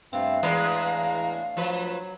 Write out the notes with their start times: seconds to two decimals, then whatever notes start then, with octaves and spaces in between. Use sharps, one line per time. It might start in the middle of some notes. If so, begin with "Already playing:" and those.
0.13 G2 A3 B3 C4 F5
0.43 E2 A2 G#3 D4 B4 A#5
1.57 F3 F#3 B4